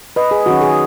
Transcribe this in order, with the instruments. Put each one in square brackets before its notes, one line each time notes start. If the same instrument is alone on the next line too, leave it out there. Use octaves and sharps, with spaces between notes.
[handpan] B4 D#5
G#4
D#3 F#3 C#4 F#4
G#4